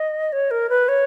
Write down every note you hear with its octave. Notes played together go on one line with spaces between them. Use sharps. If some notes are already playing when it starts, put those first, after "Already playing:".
Already playing: D#5
C#5
A#4
B4
C#5